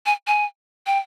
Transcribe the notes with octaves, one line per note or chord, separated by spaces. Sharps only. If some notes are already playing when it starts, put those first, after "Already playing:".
G#5
G#5
G5